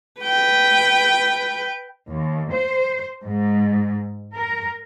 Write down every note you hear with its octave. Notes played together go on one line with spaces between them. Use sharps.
B4 G5
D#2
C5
G#2
A#4